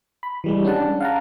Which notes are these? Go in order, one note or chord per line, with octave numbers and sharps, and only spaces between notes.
B5
E3 G3 G#3
C#4 D4 F#5 A5
F5 F#5 A5 A#5